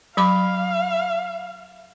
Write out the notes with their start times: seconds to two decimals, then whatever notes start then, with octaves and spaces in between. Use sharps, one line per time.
0.17 F#3 F5 B5 D6